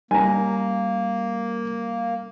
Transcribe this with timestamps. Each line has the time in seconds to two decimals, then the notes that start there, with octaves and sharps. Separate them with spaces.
0.11 G3 A#3 C#4 G#5 A#5